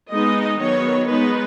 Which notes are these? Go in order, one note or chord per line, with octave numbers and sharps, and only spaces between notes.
G#3 B3 D#4 D#5
D#3 F#3 B3 C#5
G#3 B3 D#4 B4